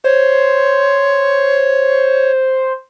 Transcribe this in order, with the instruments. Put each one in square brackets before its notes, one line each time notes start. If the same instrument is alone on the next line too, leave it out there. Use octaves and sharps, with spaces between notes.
[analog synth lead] C5 [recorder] C#5